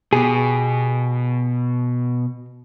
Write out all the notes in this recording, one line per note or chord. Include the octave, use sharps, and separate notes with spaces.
B2 G4 G#4